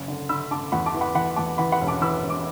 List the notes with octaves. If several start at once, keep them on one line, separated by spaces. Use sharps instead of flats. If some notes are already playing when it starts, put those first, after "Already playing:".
Already playing: F#1
D3
D3 B5 E6
D3 A5 D6
E2 F#5 B5
A5 D6
E3
F#5 B5
E3 F#5 B5
E2 A5 D6
E3 F#5 B5
F#5 B5
E1
A5 D6
E3 B5 E6
E1
D6